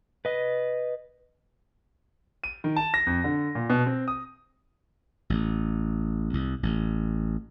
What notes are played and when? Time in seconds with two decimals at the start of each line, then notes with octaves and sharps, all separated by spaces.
0.25 B4 D#5
2.44 D#7
2.64 D#3
2.76 A5
2.94 A#6
3.06 F2
3.24 D3
3.55 A#2
3.70 B2
3.86 C4
4.08 D#6
5.30 A1
6.33 C2
6.63 A1